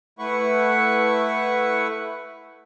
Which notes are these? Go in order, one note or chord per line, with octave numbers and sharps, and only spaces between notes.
A3 E4 B4 F#5 C#6